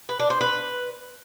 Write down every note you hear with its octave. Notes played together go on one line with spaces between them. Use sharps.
B4
D4
C5
B4